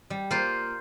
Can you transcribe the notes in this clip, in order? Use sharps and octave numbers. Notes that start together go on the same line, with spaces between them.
G3
A#3 F4 C5